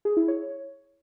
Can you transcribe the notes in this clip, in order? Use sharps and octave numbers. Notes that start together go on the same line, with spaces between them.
G#4
E4
C#5